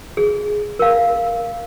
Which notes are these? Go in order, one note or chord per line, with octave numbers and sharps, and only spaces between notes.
G#4
A#4 F5